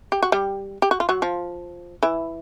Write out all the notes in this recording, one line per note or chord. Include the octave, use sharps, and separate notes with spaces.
G4
F#4
G3 G4
G4
F#4
F4
F#3 F#4
F3 F4
E3 E4